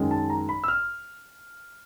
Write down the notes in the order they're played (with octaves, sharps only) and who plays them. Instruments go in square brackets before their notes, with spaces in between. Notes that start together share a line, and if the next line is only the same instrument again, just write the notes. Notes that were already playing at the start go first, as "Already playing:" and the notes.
Already playing: [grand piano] F#2 D#3 G#3 C#4
A5
A#5
B5
E6
F6